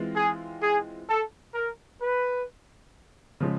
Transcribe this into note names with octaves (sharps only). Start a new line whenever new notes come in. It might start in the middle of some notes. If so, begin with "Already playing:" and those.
Already playing: E3 G#3 C4 F4
G#4
G#4
A4
A#4
B4
C#3 F3 G#3